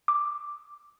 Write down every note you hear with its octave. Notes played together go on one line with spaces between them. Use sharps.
D6